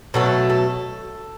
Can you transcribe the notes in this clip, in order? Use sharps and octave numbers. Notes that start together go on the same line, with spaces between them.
B2 F#3 A3 A4
A4